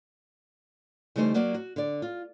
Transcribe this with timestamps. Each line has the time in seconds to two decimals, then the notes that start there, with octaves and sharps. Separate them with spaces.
1.16 C#3 E3 G3 A3 D#4 C5
1.34 F#3 A#3 F#4 D5
1.54 F#4
1.76 D3 D5
2.02 F4